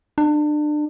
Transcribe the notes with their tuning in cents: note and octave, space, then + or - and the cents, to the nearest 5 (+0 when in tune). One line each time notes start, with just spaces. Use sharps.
D4 +30